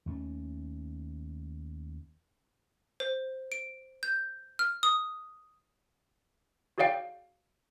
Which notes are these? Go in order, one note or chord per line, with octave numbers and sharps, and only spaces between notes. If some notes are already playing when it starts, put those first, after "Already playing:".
D#2 A3 C#4
C5
D7
G6
F6
D#6
F#4 G#4 C#5 D5 F5 G5